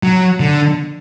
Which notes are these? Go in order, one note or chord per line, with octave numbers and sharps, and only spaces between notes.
F#3
D3